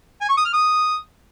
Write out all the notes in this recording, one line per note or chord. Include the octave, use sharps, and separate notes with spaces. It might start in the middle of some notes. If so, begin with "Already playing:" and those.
G#5
C#6
D#6
F6
D#6